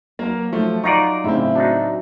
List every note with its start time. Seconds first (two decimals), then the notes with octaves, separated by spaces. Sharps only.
0.19 F#3 A#3 A#4
0.52 F3 A3
0.84 D#4 F4 D5 F#5 A#5 C#6
1.24 A2 C#3 C4 E5
1.55 D4 D#4 F#4